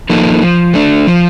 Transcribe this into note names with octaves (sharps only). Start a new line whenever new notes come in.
F3 A#3 D#4 A4
F3
A3 D4
F3